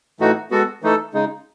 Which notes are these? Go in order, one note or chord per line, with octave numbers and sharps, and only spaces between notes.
A2 E3 A3 D#4 F#4
G#3 B3 F#4 A4
E3 A3 D#4 A4
C#3 G#3 D#4